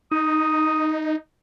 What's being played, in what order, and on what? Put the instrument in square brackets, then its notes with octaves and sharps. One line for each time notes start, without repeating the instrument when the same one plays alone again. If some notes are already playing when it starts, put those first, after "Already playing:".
[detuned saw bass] D#4 [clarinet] D#6